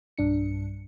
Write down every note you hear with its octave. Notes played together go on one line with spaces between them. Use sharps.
B1 G2 D4 C#7